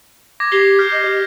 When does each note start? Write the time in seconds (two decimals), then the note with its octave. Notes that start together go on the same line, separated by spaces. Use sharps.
0.40 D6 G#6 A#6
0.52 G4 G#6 C7 G7
0.79 F6 G6
0.92 D#5
1.05 G4